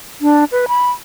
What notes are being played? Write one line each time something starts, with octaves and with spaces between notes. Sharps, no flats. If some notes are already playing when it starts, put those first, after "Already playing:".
D4
B4
B5